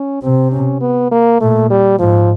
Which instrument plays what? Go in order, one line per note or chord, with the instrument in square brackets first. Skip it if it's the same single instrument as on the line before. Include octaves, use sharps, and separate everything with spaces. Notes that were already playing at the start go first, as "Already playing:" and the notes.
Already playing: [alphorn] C#4
[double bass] C3 [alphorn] C4
[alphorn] C#4
B3
A#3
[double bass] A#2 [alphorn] A3
[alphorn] G3
[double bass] G#2 [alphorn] F3